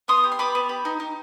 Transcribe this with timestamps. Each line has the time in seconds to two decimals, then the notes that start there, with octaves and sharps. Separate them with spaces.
0.08 B3 C6 D#6
0.24 G4
0.32 C6
0.39 B3 B5 D6
0.55 B3
0.69 G4
0.85 D#4
1.00 D#4